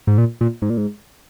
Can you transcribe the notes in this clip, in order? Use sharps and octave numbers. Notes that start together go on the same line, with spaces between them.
G#2
A#2
A#2
G#2
A#2
G#2